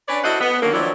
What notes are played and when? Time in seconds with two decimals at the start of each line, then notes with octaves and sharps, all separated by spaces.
0.08 C#4 D4 B4 C#5 D5
0.24 E4 F#4 A4 C5 D#5 F#5
0.40 B3
0.62 D3 D#3 F#3 A#3
0.73 D#3 F3 F#3 D4 E4